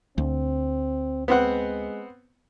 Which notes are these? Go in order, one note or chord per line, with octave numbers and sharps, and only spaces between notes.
D2 C4
G#3 B3 C4 F#5